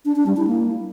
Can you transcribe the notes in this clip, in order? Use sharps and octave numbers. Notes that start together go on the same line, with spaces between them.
D4
D4
G3
E4
A#3